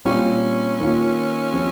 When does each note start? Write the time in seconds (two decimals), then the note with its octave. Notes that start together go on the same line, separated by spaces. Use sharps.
0.05 A#2 G3 C4 C#4 G4
0.80 D#3 A#3 F4
1.53 F3 C4 G4